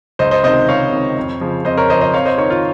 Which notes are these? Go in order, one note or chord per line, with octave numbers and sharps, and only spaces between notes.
C#2 C5 D#5
C5 D#5
C3 D#3 C5 D#5
C#2 C#5 F5
C3 D#3
F2
C#3 F3
F2 C5 D#5
A#4 C#5
C#3 F3 C5 D#5
C5 D#5
F2 C#5 F5
C5 D#5
D#3 A#4 C#5
F4